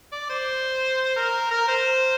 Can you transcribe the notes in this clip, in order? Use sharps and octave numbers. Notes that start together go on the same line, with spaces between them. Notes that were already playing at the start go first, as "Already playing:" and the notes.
D5
C5
A#4
A#4
C5